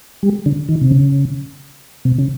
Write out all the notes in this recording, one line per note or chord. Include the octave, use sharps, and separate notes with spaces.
G3
D3
D#3
C3
C#3
C3
C#3